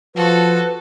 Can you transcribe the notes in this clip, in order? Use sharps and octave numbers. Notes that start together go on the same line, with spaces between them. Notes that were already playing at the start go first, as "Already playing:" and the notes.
F3 F#4 A4 B4